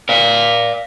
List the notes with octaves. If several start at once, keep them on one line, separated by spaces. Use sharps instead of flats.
D5 F5